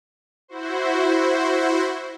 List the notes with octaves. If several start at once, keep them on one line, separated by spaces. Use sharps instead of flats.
E4 F#4 C5